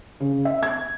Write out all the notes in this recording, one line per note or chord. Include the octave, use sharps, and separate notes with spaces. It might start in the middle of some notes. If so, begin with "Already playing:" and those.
C#3
E5
G#6